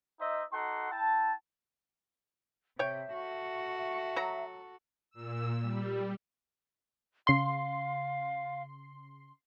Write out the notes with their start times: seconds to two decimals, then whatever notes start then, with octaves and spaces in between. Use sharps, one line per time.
0.19 D#4 C5 D#5 E5
0.52 D#4 F#4 A4 F#5 C6
0.91 E4 G5 A5
2.79 C3 C#5 E5 G5
3.12 F#4 A4
3.78 E5
4.16 F#3 A#5
5.10 A#2 E6
5.62 G3
7.27 C#3 F5 C6